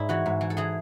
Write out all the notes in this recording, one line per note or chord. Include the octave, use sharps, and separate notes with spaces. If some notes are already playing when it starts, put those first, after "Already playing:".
Already playing: G#2 E4 D5
E3 F#4
G#2
E3
A4
E3 G#4